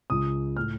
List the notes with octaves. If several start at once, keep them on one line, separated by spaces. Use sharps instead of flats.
C#2 C#3 D#6
A2 F6